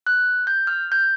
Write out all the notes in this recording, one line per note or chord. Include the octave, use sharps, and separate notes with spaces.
F#6
G6
F6
G6